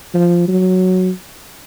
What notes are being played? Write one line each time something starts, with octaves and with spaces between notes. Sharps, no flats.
F3
F#3